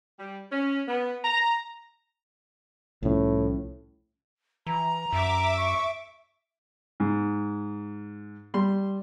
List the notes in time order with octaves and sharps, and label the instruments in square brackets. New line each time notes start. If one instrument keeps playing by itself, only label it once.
[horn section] G3
C#4
B3
A#5
[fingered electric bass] C2 F3 C#4 [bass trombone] A2
[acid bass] E3 [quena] A#5
[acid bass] F#2 [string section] E5 D6
[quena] C#6
[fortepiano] G#2
G3 C6